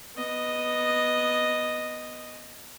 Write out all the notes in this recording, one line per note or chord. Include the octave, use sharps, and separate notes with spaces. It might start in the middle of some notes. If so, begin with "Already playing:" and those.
B3 D#5